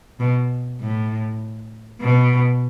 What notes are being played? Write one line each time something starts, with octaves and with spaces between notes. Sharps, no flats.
B2
A2
B2